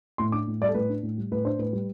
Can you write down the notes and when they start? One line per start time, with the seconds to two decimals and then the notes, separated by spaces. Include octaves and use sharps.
0.18 A2 C6
0.32 D4 D6
0.48 A2
0.61 G3 D5
0.68 A4
0.74 A2 B4
0.89 D4
1.03 A2
1.18 G3
1.31 A2 B4
1.45 D4 C5
1.59 A2 B4
1.73 G3